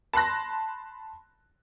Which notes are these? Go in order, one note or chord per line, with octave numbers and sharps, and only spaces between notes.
A5 B5 C6 F#6 A#6